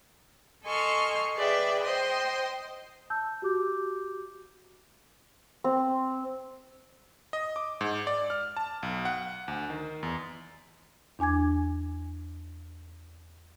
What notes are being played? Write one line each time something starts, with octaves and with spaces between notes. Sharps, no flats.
A4 D#5 G#5 C6 C#6 F6
G#4 B4 D5 E5 G5
C5 D#5 G5 C6
A5 E6 G6
F#4 G4 D6 G6
C4
D#5
D6
G#2
D5
F6
A5
B1
F#5
D2
D#3
E2
E2 D4 G#5 D6 G#6